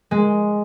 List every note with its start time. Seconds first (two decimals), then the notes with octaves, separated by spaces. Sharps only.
0.11 G#3